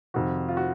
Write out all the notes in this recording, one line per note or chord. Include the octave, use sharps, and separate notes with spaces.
F2 C3 D#3 F#4
F4
F#4